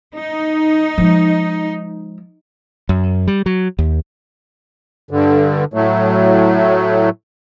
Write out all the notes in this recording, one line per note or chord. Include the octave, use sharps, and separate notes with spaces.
D#4
F3 G#3
F#2
G3
F#3
D#2
G2 D3
A2 F#3 A3